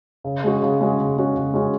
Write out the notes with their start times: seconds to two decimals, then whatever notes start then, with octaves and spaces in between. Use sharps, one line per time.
0.24 C#3
0.44 G#3 C#4 F#4
0.62 C#3
0.81 G#3 C#4 F#4
0.99 C#3
1.17 G#3 C#4 F#4
1.36 C#3
1.54 G#3 C#4 F#4